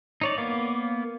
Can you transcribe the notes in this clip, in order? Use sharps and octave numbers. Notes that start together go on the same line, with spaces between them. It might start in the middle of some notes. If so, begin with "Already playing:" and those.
D#4 C#5 D5
A#3 B3 F5 D6